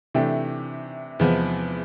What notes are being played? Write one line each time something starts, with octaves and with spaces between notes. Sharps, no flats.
C3 E3 A3 D4 G4
E2 C3 F3 G#3 B3